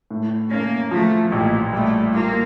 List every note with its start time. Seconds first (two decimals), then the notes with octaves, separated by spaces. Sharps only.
0.11 A2
0.51 A#3 C#4
0.91 F3 A3
1.32 A1 A#2
1.72 G3 A3
2.13 A#3 F4